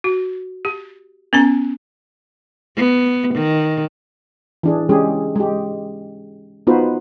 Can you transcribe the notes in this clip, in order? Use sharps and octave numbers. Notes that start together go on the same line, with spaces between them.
F#4
G4
B3 C#4 A#5
B3
D#3
E3 D4 G#4
G#3 C#4 G4 G#4
G#3 G4
B3 D#4 F4 F#4 B4 C5